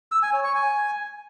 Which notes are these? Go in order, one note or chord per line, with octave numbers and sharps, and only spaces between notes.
E6
G#5
C#5
C#6
G#5